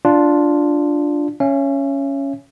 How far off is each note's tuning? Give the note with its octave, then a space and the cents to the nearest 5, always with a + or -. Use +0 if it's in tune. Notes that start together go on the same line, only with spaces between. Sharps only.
D4 +0 F4 +0
C#4 +0 E5 +40